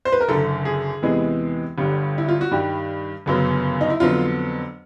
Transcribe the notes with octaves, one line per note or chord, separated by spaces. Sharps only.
C5
B4
A#4
F#1 F#2 D3 A4
G#4
E2 C3 E3 G#3 B3
G1 G2 D3 G3
E4
F4
F#4
G2 D#3 G3 G4
G1 F#2 C#3 F#3 B3
D#4
E4
F2 D3 F#3 B3 F4